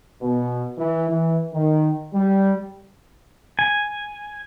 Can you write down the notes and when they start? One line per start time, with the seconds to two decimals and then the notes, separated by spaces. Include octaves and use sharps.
0.22 B2
0.78 E3
1.09 E3
1.53 D#3
2.14 G3
3.59 G#5